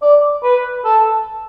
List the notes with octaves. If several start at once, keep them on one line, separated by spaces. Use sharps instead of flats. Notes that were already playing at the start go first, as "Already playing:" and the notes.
D5
B4
A4